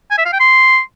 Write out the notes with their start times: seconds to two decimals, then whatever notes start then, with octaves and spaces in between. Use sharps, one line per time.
0.11 G#5
0.18 E5
0.25 F5
0.33 G5
0.40 C6